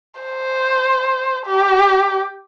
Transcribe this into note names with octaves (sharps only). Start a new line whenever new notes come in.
C5
G4